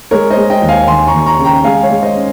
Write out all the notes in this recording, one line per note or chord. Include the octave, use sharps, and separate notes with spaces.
G#3 A#4 C#5
C5 D#5
G#3
D#5 G5
D#2
F5 G#5
D#2 G#5 C6
A#5 C#6
D#2
A#5 C#6
C#3
G5 A#5
G#3 F5 G#5
C#5 F5
G#3
C5 D#5
C#4